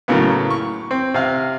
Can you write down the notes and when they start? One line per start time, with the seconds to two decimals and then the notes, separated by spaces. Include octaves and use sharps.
0.08 A2 C#3 F#3 A#3 B3
0.50 C#6
0.91 C4
1.14 C3 F5